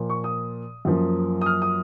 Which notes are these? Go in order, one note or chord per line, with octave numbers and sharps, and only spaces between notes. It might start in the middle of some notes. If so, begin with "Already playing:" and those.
Already playing: A#2 F3 A#3
C#6
D#6
F#2 F3 A#3
D#6
F6
D#6